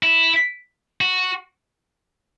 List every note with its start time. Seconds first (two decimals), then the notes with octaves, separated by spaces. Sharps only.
0.03 E4
1.01 F#4